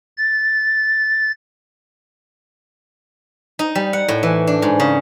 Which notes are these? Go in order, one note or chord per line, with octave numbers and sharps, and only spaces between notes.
A6
D#4
G3
F#5
A2
E3
D4
G#2
C#3